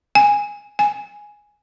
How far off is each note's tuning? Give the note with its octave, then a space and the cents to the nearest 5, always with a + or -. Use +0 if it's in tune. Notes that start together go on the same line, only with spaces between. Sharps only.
G#5 -10
G#5 +0